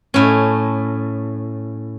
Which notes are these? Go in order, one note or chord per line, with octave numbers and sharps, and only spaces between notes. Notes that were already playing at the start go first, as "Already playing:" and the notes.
A2 C#4